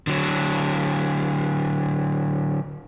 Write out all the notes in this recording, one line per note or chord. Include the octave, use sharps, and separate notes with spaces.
D3 F#3